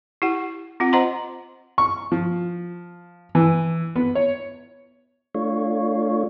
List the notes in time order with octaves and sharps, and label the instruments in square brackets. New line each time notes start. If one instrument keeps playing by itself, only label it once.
[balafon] E4 G4 F#5
C4 F4 F#5
C5 D#5 F#5 A#5 C6
[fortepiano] C#6
F3
E3
B3
C#5
[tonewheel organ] A3 D4 F4 C#5